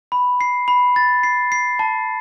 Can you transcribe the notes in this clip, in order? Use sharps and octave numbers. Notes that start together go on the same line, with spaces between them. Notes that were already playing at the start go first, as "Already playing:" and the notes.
B5
C7
B5
A6
C7
C7
A5